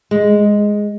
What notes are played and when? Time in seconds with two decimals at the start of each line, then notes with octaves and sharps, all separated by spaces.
0.11 G#3